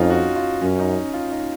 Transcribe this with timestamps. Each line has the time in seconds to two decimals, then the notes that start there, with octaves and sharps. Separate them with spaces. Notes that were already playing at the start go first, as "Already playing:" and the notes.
Already playing: F2 C#4 D#4 F4
0.10 F#4
0.36 F4
0.62 F#2 C#4
0.79 D#4
1.14 F4
1.31 D#4